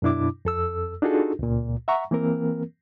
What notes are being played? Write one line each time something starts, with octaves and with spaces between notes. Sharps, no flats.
F#2 B2 D4 E4 D6
F2 A4 E6
D4 D#4 F4 F#4 G#4 A4
C#2 A#2
E5 F#5 A#5 C#6
E3 A#3 C4 A#4